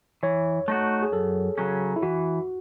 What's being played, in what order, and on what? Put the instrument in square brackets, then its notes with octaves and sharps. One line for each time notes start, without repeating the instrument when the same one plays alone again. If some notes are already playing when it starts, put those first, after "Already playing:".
[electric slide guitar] E3 [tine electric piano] C#5
[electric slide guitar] A3 D#4 F#4
[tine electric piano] G#4
[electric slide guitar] F#2 [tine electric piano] A4
[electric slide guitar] C#3 F#3 C#4
[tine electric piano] E4
[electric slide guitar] E3 [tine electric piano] F#4